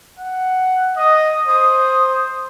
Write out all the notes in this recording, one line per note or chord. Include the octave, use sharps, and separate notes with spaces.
F#5
D#5 D#6
C5 D#6